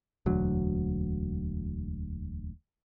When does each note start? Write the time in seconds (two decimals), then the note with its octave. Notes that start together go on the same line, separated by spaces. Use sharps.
0.26 E1 D2 F#3